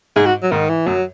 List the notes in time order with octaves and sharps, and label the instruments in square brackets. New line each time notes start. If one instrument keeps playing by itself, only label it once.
[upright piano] G#2 [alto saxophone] G#4
[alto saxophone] F#4
F#3
[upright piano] G#2 [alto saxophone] D#3
[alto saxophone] E3
[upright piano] F#2 [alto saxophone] F#3